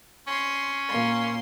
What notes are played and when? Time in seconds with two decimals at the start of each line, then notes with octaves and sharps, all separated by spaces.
0.27 C#4 C6
0.88 A#2 A#3 C6